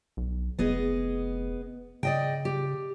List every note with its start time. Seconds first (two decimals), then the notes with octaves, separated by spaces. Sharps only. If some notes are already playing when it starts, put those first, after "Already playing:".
0.17 B1
0.59 F1 B3 G#4 D#5
2.03 C#3 D5 D#5 G5
2.45 G4